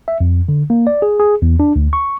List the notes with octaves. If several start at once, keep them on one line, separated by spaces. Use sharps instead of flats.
E5
F2
D3
A#3
D5
G#4
G#4
E2
D4
D2
C#6